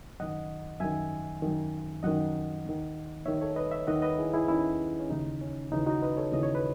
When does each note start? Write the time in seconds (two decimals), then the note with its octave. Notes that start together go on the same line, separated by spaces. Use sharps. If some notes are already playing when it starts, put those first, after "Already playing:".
0.20 F#2 D#3 D#5 F#5
0.80 F#2 D#3 E5 G#5
1.43 F#2 D#3
2.03 F#2 D#3 D#5 F#5
2.65 D#2 D#3
3.25 D#2 D#3 C#5 E5
3.41 A4 C#5
3.56 B4 D#5
3.71 C#5 E5
3.87 D#2 D#3 D#5 F#5
4.02 B4 D#5
4.19 E4 G#4
4.34 E4 G#4
4.48 D#2 D#3 C#4 E4
4.99 C#4
5.10 D#2 C#3 E3 D#4
5.41 C#4
5.72 D#2 C#3 E3 D#4
5.86 D#4 F#4
6.02 B4 D#5
6.17 A4 C#5
6.32 D#2 C#3 E3 D#5
6.43 C#5
6.55 B4